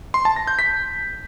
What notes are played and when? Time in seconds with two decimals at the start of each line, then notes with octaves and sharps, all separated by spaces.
0.14 C6
0.25 A5
0.36 A#6
0.47 G6
0.59 B6